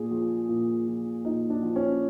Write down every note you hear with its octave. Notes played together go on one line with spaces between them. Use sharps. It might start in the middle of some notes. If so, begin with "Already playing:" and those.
Already playing: A#2 G#4
F3
A#2
F3
A#2 D#4
D4
F3
C#4